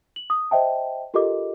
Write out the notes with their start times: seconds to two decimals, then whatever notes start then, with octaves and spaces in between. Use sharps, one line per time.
0.16 F#7
0.30 D#6
0.51 C5 D#5 E5 G5 A5
1.14 F4 G4 A4 A#4 D#5 D6